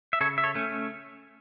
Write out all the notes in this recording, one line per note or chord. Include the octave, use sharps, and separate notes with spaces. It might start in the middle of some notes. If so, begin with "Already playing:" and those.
E5
C#3 A4 C#5
E5
A4 C#5
A3 C#4